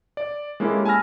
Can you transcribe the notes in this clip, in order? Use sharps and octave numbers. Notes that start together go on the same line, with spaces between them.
D5
G#3 A#3 C#4 E4 G4 A4
G#5 A5 B5 E6 F6 A#6